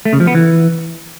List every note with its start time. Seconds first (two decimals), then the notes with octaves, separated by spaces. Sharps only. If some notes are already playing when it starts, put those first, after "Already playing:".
0.05 A3
0.13 C#3
0.20 F3
0.27 B3
0.35 E3